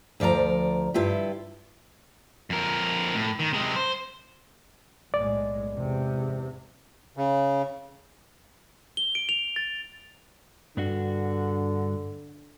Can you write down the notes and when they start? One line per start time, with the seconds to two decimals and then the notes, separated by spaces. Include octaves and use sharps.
0.20 D2 F3 D5 F5 A#5
0.94 G2 E4 F4 G4
2.50 F2 A#4
3.15 A2
3.39 D#3
3.53 C3 G#3
3.76 C5
5.14 B1 A2 G#3 D5
5.71 E2 G#2 C3
7.17 C#3
8.97 G7
9.15 D7
9.29 F7
9.56 A6
10.77 G2 D3 D4 F#4